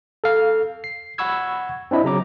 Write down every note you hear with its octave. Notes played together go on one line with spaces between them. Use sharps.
A4 F5
C7
F#5 B5 C#6 E6 G#6
C4 D4 E4 D#5
C#3 F#3 A#5 D6